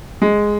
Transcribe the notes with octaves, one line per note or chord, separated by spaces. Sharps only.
G#3